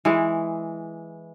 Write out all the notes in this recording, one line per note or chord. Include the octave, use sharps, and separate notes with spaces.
E3 G#3 E4